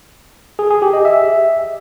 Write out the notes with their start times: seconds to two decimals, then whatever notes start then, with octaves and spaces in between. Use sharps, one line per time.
0.59 G#4
0.70 G#4
0.82 G4
0.94 D#5
1.05 E5